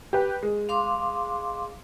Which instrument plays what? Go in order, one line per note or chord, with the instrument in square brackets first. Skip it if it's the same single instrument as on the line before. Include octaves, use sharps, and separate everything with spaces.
[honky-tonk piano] G4 B4
G#3
[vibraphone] F5 C6 D6